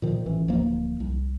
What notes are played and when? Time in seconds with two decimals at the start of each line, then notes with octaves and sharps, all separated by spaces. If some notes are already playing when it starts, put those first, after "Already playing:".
0.02 A#2 D#3 F3
0.26 A1 E3
0.48 D1 F3 A#3
1.00 C2